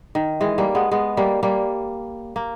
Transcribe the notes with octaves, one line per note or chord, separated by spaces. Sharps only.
D#3
E3 G#3
G3 A#3
G#3 B3
G#3 B3
G3 A#3
G3 A#3
A#3